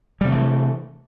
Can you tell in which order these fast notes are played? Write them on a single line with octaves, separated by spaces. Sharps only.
G3 C3 A3 E3